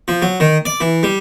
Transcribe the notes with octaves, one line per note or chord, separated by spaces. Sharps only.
F3
F#3
D#3
D5
E3
G3